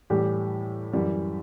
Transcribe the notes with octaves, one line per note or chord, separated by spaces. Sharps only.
A2 E3 G3 G4
F#2 E3 G3